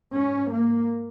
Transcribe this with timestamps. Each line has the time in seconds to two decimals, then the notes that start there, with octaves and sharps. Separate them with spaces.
0.14 G#2 C#4
0.52 A#3